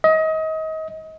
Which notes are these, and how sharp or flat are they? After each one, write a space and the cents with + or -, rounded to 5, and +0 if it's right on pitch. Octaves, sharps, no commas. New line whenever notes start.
D#5 +30